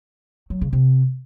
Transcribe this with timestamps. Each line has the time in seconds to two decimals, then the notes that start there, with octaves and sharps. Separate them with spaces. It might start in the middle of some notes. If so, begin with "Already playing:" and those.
0.50 F#3
0.61 C#3
0.73 C3